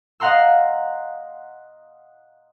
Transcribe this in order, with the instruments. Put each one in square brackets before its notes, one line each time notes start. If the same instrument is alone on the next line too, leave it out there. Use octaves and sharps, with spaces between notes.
[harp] D#5 F5 F#5 A#5 C6 E6